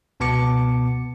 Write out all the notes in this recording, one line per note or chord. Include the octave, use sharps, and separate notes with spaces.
C#2 B2 B3 A5 D6 C#7